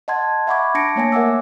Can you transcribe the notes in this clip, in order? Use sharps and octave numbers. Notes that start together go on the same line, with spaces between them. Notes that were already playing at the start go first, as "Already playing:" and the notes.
D#5 F#5 A5 C6 G#6
E5 F#5 B5 C#6 D6 G#6
D4 A5 A#6 C#7 D7
A3 A#3 C#5 G#5 A#6
A#4 E5 F#5 G#5 D6 E6